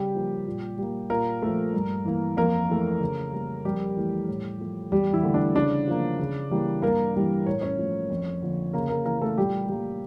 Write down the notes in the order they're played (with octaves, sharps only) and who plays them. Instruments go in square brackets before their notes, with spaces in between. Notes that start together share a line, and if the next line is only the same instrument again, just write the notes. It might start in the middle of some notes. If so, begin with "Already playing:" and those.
Already playing: [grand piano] C#3 G3 G4
F3 A#3
A#2
G3 A#3
A#2 A#3 A#4
F3 A3
G2
E3 A#3
F2 A#3 A#4
E3 A3
C#3
G3 A#3
F2 G3 G4
E3 A3
A2
F3 A3
E2 G3 G4
E3 E4
D3 A3
D4
C#3 D4
F3 A#3
C#3
E3 G3 A#3
G2 A#3 A#4
E3 G3 A#3
A2 C#5
C#4 C#5
F3 A3
F2
D3 F3 A#3
C#3 A#3 A#4
A#3 A#4
E3 A#3 A#4
A3 A4
A#2 G3 G4
G3 A#3